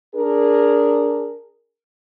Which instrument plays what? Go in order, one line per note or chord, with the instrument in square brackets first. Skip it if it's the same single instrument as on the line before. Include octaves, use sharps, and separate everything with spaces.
[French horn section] D4 G#4 A#4